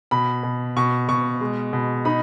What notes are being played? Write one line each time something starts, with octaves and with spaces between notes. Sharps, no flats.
B2 B5
B2
B2 C#6
B2 C#6
G#3
B2
D#4 B5